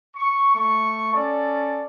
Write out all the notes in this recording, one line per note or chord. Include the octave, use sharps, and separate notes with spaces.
C#6
A3 C#6
C#4 A4 D5